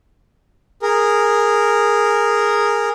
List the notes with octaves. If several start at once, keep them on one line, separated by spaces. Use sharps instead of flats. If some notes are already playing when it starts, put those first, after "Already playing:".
G#4 A#4